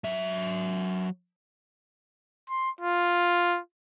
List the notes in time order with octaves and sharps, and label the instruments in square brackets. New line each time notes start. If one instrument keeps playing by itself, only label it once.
[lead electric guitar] F#3 E5
[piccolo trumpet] C6
F4